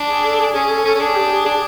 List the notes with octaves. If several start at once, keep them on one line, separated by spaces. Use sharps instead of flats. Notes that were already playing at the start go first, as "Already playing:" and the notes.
Already playing: D4
G#4
A4
G#4
C#4 G#4
A4
C#4 A4
C#4
D4 G#4
G4
G#4
D4 G#4